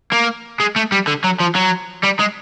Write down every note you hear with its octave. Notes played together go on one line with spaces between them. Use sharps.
A#3
G#3
A3
G3
D3
F#3
F3
F#3
G3
G#3